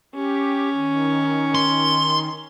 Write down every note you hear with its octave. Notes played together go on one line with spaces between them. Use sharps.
C#4 G4
D#3
C6